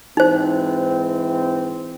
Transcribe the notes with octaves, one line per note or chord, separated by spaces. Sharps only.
G#2 E3 C4 D#4 C5